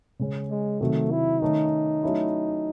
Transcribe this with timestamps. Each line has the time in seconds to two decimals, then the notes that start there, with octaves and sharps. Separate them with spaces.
0.19 C#3 G#3 C#4
0.50 G#3
0.81 C3 D#3 F#3 A3
1.11 E4
1.41 D#3 A3 C#4 D#4
2.03 F#3 A3 C#4 E4